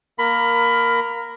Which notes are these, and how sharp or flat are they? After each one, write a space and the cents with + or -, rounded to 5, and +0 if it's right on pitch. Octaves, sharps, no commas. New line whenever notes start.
A#3 +10 A#4 +0 B5 +20